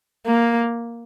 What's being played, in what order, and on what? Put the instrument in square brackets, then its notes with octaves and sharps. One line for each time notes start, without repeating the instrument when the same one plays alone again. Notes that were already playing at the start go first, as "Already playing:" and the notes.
[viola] A#3